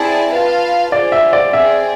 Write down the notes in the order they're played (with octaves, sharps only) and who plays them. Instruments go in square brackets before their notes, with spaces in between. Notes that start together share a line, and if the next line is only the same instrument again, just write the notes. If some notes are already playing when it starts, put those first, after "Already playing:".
Already playing: [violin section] C4 E4 G#4 D5 A5
F4 B4 F5 A5
[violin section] F4 G#4 C5 [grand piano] D5
[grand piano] E5
D5
[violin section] C4 G#4 D5 [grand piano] E5